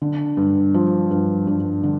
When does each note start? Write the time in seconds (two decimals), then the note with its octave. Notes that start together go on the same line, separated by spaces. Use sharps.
0.02 D3
0.37 G2
0.74 F3
1.11 G2
1.47 G2
1.84 D3